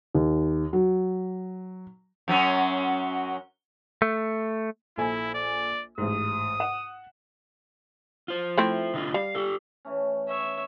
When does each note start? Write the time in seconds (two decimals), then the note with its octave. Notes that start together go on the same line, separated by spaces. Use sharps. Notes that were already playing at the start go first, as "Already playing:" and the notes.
0.15 D#2
0.73 F#3
2.28 F#2 F#3 C#4
4.02 A3
4.98 A#1 E4 A4 G#5
5.35 D5
5.98 A1 G#2 D#6
6.60 F#5 E7
8.28 F4 C5
8.58 A3 C4 E4
8.94 D3 D#4 F4
9.14 G3 F5
9.35 G4 A4
9.85 E3 A3 C#4
10.28 C#5 E5